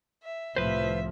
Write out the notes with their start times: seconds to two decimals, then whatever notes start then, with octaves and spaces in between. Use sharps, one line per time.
0.23 E5
0.56 C2 A2 F3 B4 C5 E5